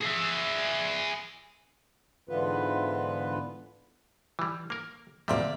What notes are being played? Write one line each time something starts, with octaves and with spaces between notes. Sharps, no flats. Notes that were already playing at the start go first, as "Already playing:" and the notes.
G#4 E5
G#2 D3 E3 B3 F4 B4
E3 G3
A#3 A#4
D2 A#2 G3 A#3 D5 E5